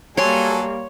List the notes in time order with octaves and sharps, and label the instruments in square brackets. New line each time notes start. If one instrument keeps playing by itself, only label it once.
[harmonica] F#3 A4 G#5 [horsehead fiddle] G3 A#3 [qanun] C#5 C6